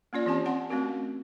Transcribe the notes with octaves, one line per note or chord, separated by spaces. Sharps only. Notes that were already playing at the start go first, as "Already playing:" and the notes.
A#3 C#4 F4 D5
E3 C4 G4 G#5 A5
C4 F#5 A5 C6
A3 C4 C#4 F#4 A#4